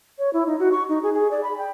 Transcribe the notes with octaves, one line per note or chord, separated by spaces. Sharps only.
C#5
E4
D#4
F#4
C#6
D#4
G#4
G#4
D5
B5
G5